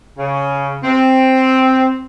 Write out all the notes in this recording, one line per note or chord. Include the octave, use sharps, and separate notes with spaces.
C#3
C4